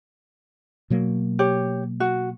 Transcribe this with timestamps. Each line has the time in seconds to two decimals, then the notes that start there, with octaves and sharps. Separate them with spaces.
0.90 B2 F#3 A#3
1.39 G4 C#5
2.00 F#4